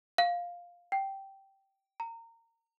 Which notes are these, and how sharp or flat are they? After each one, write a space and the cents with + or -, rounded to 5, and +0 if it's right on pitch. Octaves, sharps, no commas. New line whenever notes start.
F5 +5
G5 -10
A#5 -25